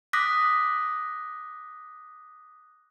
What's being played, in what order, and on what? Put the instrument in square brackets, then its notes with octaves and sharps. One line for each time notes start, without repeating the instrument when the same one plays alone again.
[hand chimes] D6 D#6 F#6 A#6 B6